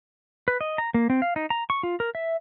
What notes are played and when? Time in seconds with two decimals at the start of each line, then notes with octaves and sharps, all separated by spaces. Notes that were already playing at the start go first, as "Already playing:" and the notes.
0.48 B4
0.61 D#5
0.78 A#5
0.94 A#3
1.10 C4
1.22 F5
1.36 D#4
1.50 A#5
1.70 C#6
1.83 F4
2.00 A#4
2.15 E5